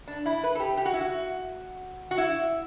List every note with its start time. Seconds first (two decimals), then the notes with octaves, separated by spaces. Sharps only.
0.08 D4
0.26 E4
0.44 B4
0.55 A4
0.60 G4
0.77 G4
0.85 F#4
0.94 E4
1.01 F#4
2.11 F#4
2.18 E4